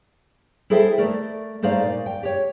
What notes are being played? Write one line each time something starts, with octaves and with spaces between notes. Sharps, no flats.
E4 G#4 A4 C5 E5 G5
A3 A#4 D5
A3 D#4 C5 D5 F5
A#2
G5
G4 C#5